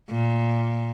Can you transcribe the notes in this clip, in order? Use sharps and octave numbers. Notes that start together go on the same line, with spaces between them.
A#2